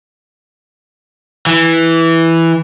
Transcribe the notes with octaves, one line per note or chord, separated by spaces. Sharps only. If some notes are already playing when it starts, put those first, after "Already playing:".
E3